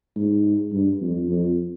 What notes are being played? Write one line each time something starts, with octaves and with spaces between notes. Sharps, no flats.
G#2
G2
F2
F2